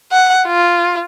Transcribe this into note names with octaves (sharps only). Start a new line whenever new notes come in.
F#5
F4